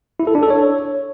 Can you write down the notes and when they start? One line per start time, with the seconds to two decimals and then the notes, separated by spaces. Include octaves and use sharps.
0.20 E4
0.27 A4
0.35 D4
0.43 A4
0.50 C#5